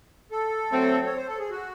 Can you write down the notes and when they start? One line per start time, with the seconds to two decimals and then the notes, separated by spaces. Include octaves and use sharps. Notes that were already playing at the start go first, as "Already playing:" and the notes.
0.31 A4
0.71 F#3 A3 C4
1.06 C#5
1.16 C5
1.28 A4
1.39 G#4
1.50 F#4